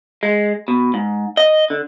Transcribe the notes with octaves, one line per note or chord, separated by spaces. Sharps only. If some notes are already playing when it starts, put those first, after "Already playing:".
G#3
B2
G#2
D#5
D3